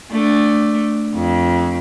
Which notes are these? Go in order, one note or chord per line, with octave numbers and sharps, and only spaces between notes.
A3 D4
F2